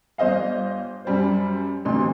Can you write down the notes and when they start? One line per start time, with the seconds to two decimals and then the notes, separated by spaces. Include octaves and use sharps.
0.18 G1 C5 D#5 F5
1.05 F#2 G3 C5
1.85 A1 D2 C3 C6